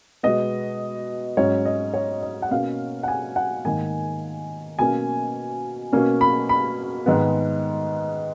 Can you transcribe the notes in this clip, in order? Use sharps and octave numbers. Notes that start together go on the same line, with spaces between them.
B2 G#3 B3 D#5
G#2 F#3 C#4 C#5
D#5
C#5
D#5
F#5
B2 A#3 C#4 F5
F#5
G#5
F#5
G#2 D#3 A#3 G#5
B2 A#3 C#4 G#5
B2 A#3 C#4
B5
B5
G#2 D#3 G#3 B3